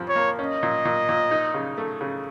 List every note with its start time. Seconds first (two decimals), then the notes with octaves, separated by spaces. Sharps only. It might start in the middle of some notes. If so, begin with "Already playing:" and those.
Already playing: F2 F3
0.09 C#5
0.16 A#3
0.39 C#4 D#5
0.63 A#2
0.85 A#2
1.09 A#2
1.31 D#4
1.54 C#3
1.78 A3
2.01 C#3